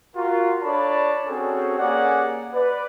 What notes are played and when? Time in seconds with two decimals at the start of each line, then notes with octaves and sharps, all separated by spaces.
0.16 F4 F#4 A#4
0.63 D4 A4 C#5 D5 A5 B5
1.27 C4 C#4 F#4 G#4 A4
1.79 A#3 C#4 G4 G#4 D5 F#5
2.54 B4 D5